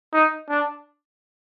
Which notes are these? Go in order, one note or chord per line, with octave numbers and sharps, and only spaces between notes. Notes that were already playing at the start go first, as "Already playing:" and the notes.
D#4
D4